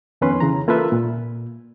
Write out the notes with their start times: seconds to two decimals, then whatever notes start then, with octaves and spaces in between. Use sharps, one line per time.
0.21 F2 D#3 B3 C#4 B4 C6
0.40 C#3 E3 A#5
0.68 A#3 F4 A4 B4 E5
0.92 A#2